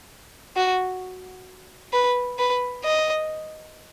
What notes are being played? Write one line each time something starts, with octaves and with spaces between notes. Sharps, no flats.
F#4
B4
B4
D#5